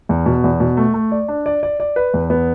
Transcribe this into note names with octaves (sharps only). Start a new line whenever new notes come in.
E2
B2
E2
B2
A3
A3
D5
D4
D5
D5
D5
B4
E2
B3